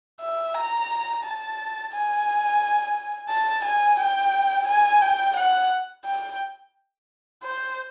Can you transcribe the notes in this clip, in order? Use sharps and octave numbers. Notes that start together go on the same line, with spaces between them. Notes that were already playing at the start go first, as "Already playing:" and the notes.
E5
A#5
A5
G#5
A5
G#5
G5
G#5
G5
F#5
G5
C5